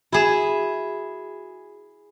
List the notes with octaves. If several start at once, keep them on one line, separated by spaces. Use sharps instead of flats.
E4 F#4 G#4 G#6 E7